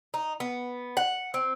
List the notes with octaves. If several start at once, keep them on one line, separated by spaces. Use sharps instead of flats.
D#4
B3
F#5
C4